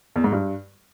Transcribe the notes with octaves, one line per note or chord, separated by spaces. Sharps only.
E2
G#2
G2